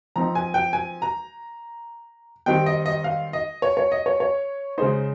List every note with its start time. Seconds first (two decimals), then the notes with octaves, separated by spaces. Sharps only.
0.16 F3 C4 D#4 A#5
0.35 G#5
0.54 G5
0.73 G#5
1.02 A#5
2.46 D#3 G3 C4 D#4 G5
2.66 D#5
2.86 D#5
3.04 F5
3.33 D#5
3.62 C#5
3.77 C#5
3.92 D#5
4.06 C#5
4.20 C#5
4.78 C#3 G#3 D#4 C5